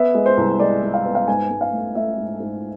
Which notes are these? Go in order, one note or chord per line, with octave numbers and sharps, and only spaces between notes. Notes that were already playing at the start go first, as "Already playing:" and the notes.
Already playing: B3 E5
G#3
C5
C2
G#3 D5
G#3
F5
B3
F5
G#2 G#5
G#2
F5
A3
A3 E5
G#2
G#2